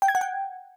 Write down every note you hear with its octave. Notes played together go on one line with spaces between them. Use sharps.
G5
G#6
F#5
G5